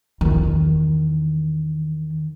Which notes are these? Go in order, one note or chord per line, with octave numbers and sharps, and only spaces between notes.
E2 D#3